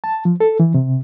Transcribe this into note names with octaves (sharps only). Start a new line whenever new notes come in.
A5
F3
A4
E3
C3